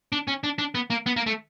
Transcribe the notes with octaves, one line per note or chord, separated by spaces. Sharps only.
D4
C#4
D4
D4
B3
A#3
B3
A#3
A3